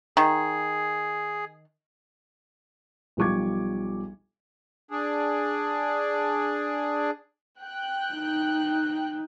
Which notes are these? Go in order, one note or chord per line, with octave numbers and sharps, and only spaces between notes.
D#3 G#4
B1 F3 G3 C#6 D6 G#6
D4 G#4
G5 F#6
D#4